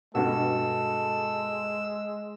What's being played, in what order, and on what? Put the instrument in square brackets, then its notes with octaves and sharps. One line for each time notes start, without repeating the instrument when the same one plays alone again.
[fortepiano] G2 B2 [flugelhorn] G#3 [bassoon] A4 [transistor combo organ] E6